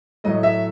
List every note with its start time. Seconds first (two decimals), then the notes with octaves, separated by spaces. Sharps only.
0.24 A2 F#3 A3 D#5
0.43 E5